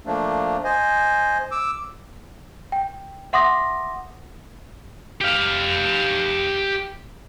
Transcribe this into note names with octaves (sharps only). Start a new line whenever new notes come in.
F3 A3 A#3 D4
C5 D#5 G#5
D6 E6
G5
E5 F#5 C6 D6 D#6 A#6
G4 F5